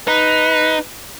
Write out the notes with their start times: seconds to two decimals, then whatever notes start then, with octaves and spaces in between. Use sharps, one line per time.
0.08 D#4 B4